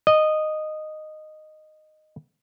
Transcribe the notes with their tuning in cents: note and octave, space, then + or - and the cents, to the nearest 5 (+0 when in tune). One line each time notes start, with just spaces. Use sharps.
D#5 -10